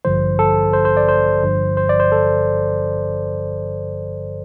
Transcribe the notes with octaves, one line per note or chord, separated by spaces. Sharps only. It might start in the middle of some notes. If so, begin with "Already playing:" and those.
A1 G2 D3 F3 C5
A4
C5
C5
D5
C5
G1 G2 D3 F3
C5
D5
C5
A4